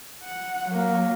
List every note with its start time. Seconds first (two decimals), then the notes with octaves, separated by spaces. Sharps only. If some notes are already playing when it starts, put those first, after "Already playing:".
0.23 F#5
0.68 F#3 A#3